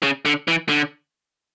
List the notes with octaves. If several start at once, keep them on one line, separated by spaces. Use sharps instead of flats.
C#3
D3
E3
D3